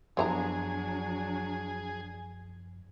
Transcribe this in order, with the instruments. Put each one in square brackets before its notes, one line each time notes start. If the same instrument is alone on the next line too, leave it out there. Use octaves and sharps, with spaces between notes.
[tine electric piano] F#2 F3 [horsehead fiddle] F#3 D4 [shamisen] B3 C5 A#5 [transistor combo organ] G#4